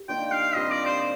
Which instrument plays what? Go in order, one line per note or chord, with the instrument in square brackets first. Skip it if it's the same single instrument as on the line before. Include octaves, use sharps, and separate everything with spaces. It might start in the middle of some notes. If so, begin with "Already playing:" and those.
Already playing: [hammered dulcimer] G4
[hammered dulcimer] D#3 A#3 D4 F4 [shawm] G5
[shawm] F5
[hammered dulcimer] A#2 G3 C4 [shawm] D#5
[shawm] D5
C5